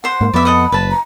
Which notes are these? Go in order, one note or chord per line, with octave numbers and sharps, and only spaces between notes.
C5 F#5 C6
G#2 A#3
F2 B3 D5 E5 B5
A4 D#5 F#5
F#1 B4 A5
A#5